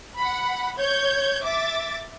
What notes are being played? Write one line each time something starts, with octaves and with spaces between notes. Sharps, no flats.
F#5 B5
C#5 G6 G#6
E5 D6 A6